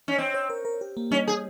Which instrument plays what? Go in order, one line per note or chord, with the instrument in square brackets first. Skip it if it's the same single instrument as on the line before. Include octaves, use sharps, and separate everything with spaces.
[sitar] C#4
[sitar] C4 [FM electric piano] C#5
[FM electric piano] C#5
A#4
A#4
G4
A#3
[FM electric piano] G3 [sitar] C#4
[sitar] G#4